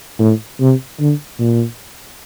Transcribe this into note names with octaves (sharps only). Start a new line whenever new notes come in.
A2
C3
D3
A#2